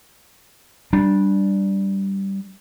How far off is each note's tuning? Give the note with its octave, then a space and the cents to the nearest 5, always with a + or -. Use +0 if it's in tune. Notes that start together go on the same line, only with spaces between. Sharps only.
G3 -5 D4 +0